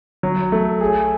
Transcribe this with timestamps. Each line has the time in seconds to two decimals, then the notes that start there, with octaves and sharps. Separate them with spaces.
0.23 F#3
0.52 A3
0.81 G#4